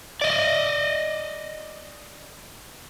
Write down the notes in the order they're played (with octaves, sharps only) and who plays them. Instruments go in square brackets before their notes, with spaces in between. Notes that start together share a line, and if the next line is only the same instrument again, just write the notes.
[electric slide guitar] D5 D#5